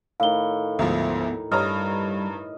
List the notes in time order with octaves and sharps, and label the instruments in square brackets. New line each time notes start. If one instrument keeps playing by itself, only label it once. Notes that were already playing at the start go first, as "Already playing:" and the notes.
[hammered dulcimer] A2 D#3 [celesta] F5 G7
[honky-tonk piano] D2 G#2 F3 [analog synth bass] B3
[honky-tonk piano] G2 C#5 A#5 [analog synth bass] G3 [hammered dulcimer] D#5 [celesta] F6